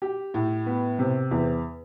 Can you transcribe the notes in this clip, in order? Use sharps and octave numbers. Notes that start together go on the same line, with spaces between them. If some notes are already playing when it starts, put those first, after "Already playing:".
G4
A2
B3
C3
E2